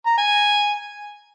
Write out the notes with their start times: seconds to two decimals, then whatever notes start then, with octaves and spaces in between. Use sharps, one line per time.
0.07 A#5
0.18 G#5